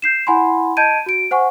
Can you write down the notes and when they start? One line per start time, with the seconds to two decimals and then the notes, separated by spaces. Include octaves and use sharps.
0.02 G6 C7 E7
0.27 E4 F#5 G#5 B5 C6
0.77 D#5 A5 G6 G#6 D7 D#7
1.06 F#4 D7
1.31 C5 F#5 G#5 C#6